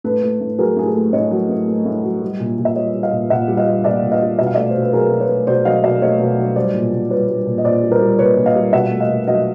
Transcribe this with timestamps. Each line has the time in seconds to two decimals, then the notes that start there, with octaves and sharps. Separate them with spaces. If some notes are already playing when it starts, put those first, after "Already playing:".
0.04 A2 A4 B4
0.23 A3
0.41 A2
0.59 F#3 G#4 A#4
0.77 A2 G#4
0.86 G4 A4
0.95 A3
1.13 A2 C#5 D#5
1.31 F#3
1.49 A2
1.68 A3
1.85 A2
2.03 F#3
2.22 G3
2.40 A#2
2.58 A#2
2.65 E5
2.76 G3 C#5 D#5
2.94 G3
3.03 D#5 F5
3.12 A#2
3.30 A#2 E5 F#5
3.48 G3
3.57 D#5 F5
3.66 G3
3.84 A#2 D5 E5
4.02 A#2
4.12 D#5 F5
4.21 G3
4.39 B2 E5
4.47 F5
4.55 A3 D5 E5
4.70 B2 C5
4.82 B4
4.93 F#3 G#4 A#4
5.11 B2
5.20 B4 C#5
5.29 A3
5.47 B2 C5 D5
5.65 F#3 D#5 F5
5.83 B2 D5 E5
6.02 A3 C#5 D#5
6.19 B2
6.38 F#3
6.56 G3 C5 D5
6.74 A#2
6.92 A#2
7.10 G3 B4 C#5
7.28 G3
7.46 A#2
7.58 D#5
7.64 A#2 C5 D5
7.82 G3
7.91 A#4 C5
8.01 G3
8.19 A#2 B4 C#5
8.37 A#2
8.46 D#5 F5
8.55 G3
8.73 B2 E5 F#5
8.91 A3
9.00 D#5 F5
9.09 B2
9.27 F#3 D#5 F5